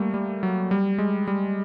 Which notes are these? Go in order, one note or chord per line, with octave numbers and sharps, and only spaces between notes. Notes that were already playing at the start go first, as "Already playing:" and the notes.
Already playing: G3 A3 A#3
G3
F#3
G3
G#3
G3